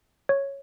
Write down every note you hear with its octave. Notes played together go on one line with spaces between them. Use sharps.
C#5